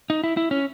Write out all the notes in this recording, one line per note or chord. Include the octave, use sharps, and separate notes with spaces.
D#4
E4
E4
C#4